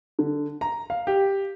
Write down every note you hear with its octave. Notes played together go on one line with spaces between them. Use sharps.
D3
A#5
F5
G4